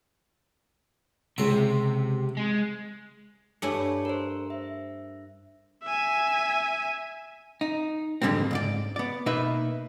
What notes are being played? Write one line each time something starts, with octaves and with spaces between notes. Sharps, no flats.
C#2 C3 E5
G#3
G2 A3 E4 C#5 G#5 C#7
A#4 C5
E5
E5 G#5
D#4
F2 G#2 D3 G3 A#3 C4
C#2 G#2 D5
B3 D5
B2 A#3 D#4 B4 E5